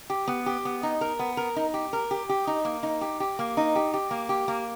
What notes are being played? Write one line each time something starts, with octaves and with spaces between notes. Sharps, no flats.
G4
B3
G4
B3
D#4
A#4
B3
A#4
D#4
G4
A#4
G4
G4
D#4
A#3
D#4
G4
G4
A#3
D#4
G4
G4
A#3
G4
A#3